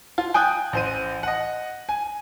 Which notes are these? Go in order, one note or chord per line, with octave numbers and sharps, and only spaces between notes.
F4
G5 G#5 D#6 F#6 G6
A1 C5 D#7
D#5 F#5
G#5